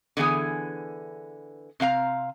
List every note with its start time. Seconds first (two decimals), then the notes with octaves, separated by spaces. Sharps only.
0.17 D3 E3 B3 G#4 G#5
1.80 C3 C4 F5 A#5